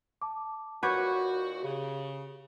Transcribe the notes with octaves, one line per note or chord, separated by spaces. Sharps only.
A5 D6
D#2 A#2 F#4 B4 C#5 F#5 D6 G6
C#3 G4